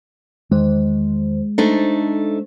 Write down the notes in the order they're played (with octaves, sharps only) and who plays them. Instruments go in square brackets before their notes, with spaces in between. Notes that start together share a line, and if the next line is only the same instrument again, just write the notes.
[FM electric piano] E2 D#3 C5 [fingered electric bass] G#3
[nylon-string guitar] A3 D4 D#4 [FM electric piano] A4 C5